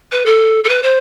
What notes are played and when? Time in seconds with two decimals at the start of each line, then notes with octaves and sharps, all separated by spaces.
0.12 B4
0.26 A4
0.64 A4
0.69 B4
0.83 C5